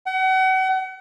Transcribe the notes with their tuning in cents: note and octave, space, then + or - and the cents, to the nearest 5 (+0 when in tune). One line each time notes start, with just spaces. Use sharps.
F#5 +35